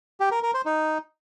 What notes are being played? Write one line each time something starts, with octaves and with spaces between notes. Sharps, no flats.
G4
A#4
A#4
C5
D#4